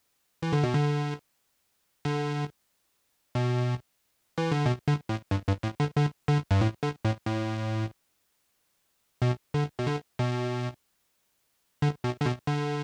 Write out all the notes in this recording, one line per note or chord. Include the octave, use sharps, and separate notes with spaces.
E3
D3
B2
D3
D3
B2
E3
D3
B2
D3
A2
G2
G2
A2
D3
D3
D3
G2
A2
D3
A2
A2
B2
D3
B2
D3
B2
D3
B2
D3
B2
D3